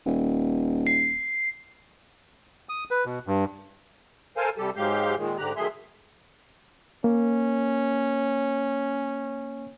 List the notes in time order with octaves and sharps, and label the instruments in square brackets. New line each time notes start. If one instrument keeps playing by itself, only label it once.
[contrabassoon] D#1
[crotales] C7
[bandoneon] D#6
B4
B2
G2
[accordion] A4 A#4 C5 F5 G#5
C3 G3 G4 A4
G#2 F#3 G#3 G4 F5 G6
A#2 D#3 G#3
G#2 D3 G4 A#5 F#6
D#3 F#3 A3 G#4 E5 C6
[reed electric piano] A#3 [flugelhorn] C#4